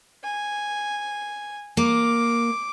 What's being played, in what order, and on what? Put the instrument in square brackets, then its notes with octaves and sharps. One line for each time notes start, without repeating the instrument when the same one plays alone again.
[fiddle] G#5
[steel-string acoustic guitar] A#3 [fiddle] D6